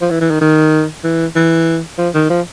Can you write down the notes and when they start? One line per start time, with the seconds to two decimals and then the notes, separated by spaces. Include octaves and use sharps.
0.01 F3
0.10 E3
0.21 E3
0.31 D#3
0.41 D#3
1.04 E3
1.35 E3
1.98 F3
2.14 D#3
2.30 F3